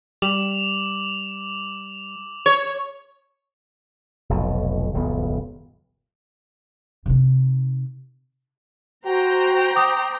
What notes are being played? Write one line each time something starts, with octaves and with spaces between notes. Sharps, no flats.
G3 D6 F7 F#7
C#5
F1 B1 F2 A2
D#1 C#2 F#2 B3
C3 D#4
F#4 C5 G5 A#5
D6 D#6